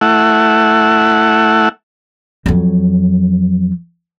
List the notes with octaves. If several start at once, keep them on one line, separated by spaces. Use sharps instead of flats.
A3 E4 F#5
F2 F#3